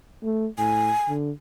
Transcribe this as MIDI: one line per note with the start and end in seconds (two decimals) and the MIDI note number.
0.23 0.47 57
0.58 0.91 45
0.58 1.09 80
1.09 1.31 50